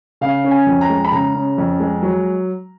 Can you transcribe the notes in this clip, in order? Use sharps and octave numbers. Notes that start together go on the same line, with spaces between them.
C#3 F5
C#4
G#5
F2
A#5
G#3
B5
C#3 A#5
C#4
F2
G#3
F#3